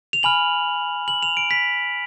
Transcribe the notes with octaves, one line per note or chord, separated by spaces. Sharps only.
F7
G#5 B5 F6 F#7
F#7
F7
D7
B6